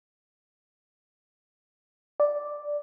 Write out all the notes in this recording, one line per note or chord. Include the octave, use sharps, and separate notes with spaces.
D5